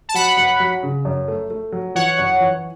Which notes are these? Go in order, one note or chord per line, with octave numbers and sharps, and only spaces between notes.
A5
F#3 F#5 B5
F#2
F#3
C#3
F#2
A3
A3
F#3
E3 C#5 F#5
F#2
E3